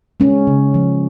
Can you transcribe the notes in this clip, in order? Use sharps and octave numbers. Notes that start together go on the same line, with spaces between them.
G#3 C#4
C#3
F3